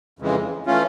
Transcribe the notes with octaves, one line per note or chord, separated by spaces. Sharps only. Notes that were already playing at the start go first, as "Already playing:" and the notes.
F2 C#3 E3 G#3
E3 A3 C#4 F4